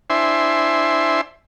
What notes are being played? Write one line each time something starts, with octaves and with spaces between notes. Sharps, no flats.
D4 E4 C5 E5 G#5 C6